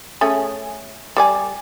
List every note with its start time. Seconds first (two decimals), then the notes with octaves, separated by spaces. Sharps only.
0.21 A3 C#4 G#4
1.17 G3 D5 G#5